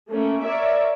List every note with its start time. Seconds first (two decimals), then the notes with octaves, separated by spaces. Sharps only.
0.11 A3 A#3 C#4
0.44 A#4 C#5 D5 E5